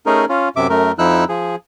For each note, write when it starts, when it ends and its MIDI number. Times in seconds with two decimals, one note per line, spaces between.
0.06 0.25 57
0.06 0.25 61
0.06 0.25 63
0.06 0.25 68
0.06 0.25 70
0.29 0.49 61
0.29 0.49 65
0.56 0.67 42
0.56 0.67 48
0.56 0.67 76
0.56 0.67 86
0.69 0.92 42
0.69 0.92 57
0.69 0.92 70
0.99 1.24 41
0.99 1.24 53
0.99 1.24 63
0.99 1.24 64
0.99 1.24 88
0.99 1.24 90
1.29 1.56 53
1.29 1.56 68